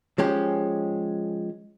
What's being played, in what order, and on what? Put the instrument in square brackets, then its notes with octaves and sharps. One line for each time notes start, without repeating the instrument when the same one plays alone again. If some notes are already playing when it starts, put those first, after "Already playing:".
[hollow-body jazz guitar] F3 G#3 C#4 G4